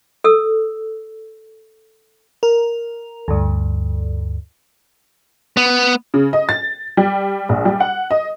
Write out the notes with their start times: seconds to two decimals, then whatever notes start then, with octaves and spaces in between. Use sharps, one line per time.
0.24 A4 E6
2.43 A#4
3.28 D2 G2
5.57 B3
6.14 C#3
6.33 D#5
6.49 A6
6.97 G3
7.49 A#1
7.65 G3
7.80 F#5
8.11 D#5